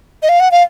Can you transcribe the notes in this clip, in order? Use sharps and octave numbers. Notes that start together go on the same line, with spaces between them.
D#5
F5
F#5
F5